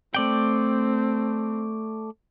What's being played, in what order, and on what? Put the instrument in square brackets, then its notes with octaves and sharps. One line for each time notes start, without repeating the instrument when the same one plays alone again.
[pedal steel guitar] A3 D5 G5 [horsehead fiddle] C4